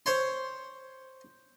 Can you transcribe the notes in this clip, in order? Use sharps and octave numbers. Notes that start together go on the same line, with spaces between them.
C5 C#5 C6